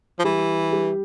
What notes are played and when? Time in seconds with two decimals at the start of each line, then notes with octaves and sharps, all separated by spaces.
0.19 F3
0.24 E3 G3 G4
0.72 G3 G4